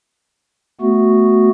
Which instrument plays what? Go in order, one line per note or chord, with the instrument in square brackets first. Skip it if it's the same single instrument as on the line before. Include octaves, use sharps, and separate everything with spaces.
[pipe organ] A3 B3 F#4